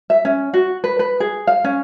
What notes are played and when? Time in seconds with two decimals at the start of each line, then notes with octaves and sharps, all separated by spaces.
0.10 E5
0.25 C#4
0.54 F#4
0.84 B4
0.99 B4
1.20 G#4
1.47 F5
1.64 C#4